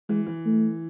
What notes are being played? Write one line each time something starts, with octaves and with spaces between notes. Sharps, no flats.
E3 G#3
E3
A3